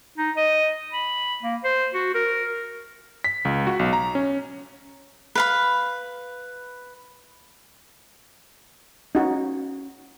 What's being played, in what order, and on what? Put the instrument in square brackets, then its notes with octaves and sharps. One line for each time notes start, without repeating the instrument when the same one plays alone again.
[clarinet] D#4
D#5
B5
A#3
C5
F#4
A#4
[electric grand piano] B6
C#2
F#4
B1
A#5
C#4
[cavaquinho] B4 F5 B5
[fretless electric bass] C#4 [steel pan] D#4 F#4